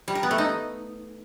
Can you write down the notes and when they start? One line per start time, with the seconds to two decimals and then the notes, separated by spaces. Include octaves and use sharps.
0.08 G3
0.15 A#4
0.23 B3
0.31 A3
0.38 D#4